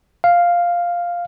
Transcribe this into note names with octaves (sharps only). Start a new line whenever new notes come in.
F5